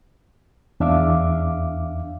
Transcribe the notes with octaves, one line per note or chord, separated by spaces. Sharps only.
E2 D4 E5 F5 D6